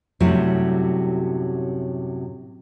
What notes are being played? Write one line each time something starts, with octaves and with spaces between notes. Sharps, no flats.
F#2 A2 C3 F#3 G3 E4